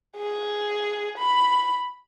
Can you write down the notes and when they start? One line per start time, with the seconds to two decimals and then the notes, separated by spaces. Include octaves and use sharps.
0.17 G#4
1.18 B5